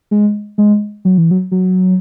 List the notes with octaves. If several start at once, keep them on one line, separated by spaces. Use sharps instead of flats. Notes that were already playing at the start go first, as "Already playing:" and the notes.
G#3
G#3
F#3
E3
F#3
F#3